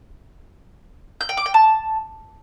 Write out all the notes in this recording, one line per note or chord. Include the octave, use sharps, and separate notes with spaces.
G6
G5
D6
G5
A5